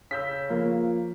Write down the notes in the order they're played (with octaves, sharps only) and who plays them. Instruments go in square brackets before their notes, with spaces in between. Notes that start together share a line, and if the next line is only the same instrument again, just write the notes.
[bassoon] C#3 [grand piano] E6 G6 B6
[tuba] F3 [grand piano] A#3